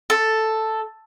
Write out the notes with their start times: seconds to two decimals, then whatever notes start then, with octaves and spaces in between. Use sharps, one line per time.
0.10 A4